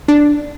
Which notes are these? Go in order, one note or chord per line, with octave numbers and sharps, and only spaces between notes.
D4